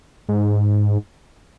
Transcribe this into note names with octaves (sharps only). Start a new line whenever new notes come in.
G#2